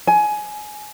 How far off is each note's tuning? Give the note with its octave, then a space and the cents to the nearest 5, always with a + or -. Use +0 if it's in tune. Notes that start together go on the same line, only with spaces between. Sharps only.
G#5 +20